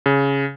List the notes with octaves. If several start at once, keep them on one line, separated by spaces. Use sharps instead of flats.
C#3